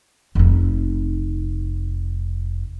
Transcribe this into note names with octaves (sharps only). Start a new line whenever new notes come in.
F1 D#4